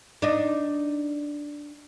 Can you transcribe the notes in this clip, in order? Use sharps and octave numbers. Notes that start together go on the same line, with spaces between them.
D4 D#4